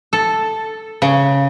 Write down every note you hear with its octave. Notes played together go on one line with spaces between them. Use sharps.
A4
C#3